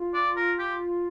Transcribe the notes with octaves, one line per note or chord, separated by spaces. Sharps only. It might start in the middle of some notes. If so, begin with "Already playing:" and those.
Already playing: F4
D5
A#4
G4